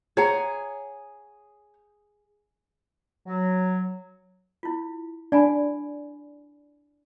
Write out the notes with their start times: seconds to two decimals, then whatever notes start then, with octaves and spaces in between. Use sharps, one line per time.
0.17 G#4 C#5 F#5 A#5
3.27 F#3
4.63 E4 F4
5.32 D4 D5 G#5 B5